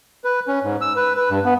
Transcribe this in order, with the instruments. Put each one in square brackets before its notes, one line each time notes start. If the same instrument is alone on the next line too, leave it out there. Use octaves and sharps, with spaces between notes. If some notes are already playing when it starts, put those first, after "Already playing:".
[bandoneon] B4
C#4
G#2
E6
B4
B4
G2
B3